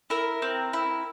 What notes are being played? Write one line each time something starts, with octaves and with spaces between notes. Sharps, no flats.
E4 A#4
C4
E4